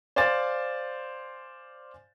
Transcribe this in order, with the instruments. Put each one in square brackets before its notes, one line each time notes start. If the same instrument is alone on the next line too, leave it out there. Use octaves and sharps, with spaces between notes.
[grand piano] C5 D5 F5 G#5 A6